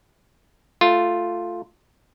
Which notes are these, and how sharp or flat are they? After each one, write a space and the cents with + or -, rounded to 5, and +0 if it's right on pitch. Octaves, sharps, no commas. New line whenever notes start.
A3 +0 F4 +0